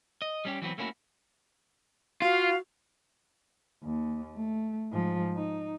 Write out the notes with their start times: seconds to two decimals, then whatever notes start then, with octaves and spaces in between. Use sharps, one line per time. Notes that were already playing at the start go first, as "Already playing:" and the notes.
0.22 D#5
0.45 G3 C#4 G4
0.62 E3 F#3 B3 C4
0.78 A3 A#3 C#4 E4 F#4
2.22 F4 F#4 F5
3.84 D#2
4.36 A3
4.92 G#2 F3
5.37 D#4